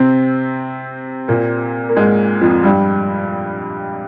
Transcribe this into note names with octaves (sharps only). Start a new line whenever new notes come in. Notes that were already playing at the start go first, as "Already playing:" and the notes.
Already playing: C3 C4
A#2 A#3
A#3
G#2 G#3
F2 F3
G2 G3